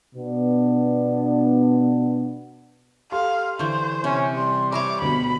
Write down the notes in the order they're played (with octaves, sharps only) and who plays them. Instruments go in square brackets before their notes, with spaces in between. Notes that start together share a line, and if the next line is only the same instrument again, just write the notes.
[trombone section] B2 B3 D4
[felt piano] G4 A4 C6 [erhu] F5
[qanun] D3 E3 [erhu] C5 [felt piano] C#6 G6
[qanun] C3 [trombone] C#4
[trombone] G3 [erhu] C6
[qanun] A#4 C5 C#5 [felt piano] E5 B5 C#6 [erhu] D6
[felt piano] D2 B2 [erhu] B5